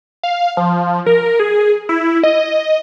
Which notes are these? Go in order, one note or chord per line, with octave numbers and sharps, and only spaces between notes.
F5
F3
A#4
G#4
E4
D#5